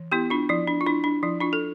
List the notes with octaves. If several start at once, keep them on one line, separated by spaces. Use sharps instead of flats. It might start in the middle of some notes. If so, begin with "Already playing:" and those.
Already playing: E3
B3 E4 G4
D4 F4
F3 E4
D4
F4
D4 E4
D4
F3 E4
D4 F4
A4